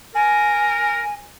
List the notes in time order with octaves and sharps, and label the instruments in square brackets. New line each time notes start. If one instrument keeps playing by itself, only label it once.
[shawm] A#4 [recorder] G#5